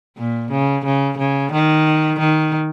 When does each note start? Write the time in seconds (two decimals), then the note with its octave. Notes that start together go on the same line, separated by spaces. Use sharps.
0.18 A#2
0.52 C#3
0.85 C#3
1.18 C#3
1.52 D#3
2.20 D#3